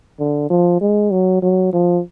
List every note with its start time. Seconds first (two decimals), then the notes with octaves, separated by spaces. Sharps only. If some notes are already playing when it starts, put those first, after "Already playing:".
0.19 D3
0.50 F3
0.81 G#3
1.12 F#3
1.42 F#3
1.73 F3